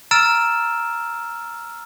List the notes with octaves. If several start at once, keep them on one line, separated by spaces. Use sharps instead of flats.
A#5 E6 F6 A6 D7 E7